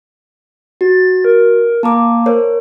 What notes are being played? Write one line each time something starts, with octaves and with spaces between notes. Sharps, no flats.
F#4 A6
A#4
A#3 A5 A#5 D6
A#4 C5 C#5